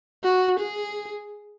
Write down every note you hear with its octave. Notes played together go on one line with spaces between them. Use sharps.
F#4
G#4